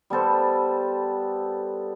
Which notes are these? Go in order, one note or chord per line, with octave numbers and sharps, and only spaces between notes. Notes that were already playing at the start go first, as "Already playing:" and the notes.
G3 B3 A4 C5